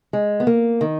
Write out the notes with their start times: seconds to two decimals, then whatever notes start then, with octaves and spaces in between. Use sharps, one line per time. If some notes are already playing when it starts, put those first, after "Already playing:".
0.13 G#3
0.40 B3
0.47 A#3
0.81 D#3